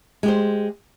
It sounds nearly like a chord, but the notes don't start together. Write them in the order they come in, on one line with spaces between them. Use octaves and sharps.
G#3 G4 C5